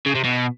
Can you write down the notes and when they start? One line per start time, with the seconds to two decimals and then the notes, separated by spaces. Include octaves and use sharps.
0.06 C#3
0.15 C3
0.24 B2